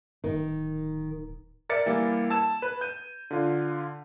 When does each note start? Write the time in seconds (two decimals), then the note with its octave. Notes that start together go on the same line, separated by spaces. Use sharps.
0.24 D1 D#3
1.69 A#4 D5 E5 A6 C#7
1.86 E3 G3 A#3
2.30 A5 E6 G#6 E7
2.62 B4
2.81 G6 D#7
3.31 D3 F4